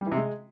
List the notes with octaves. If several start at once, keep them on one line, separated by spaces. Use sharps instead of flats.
G3
E3
C3
G#3